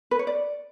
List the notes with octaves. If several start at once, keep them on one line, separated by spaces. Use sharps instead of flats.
B4
C#5
D5